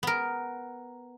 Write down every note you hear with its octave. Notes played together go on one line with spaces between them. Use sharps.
B3 A#4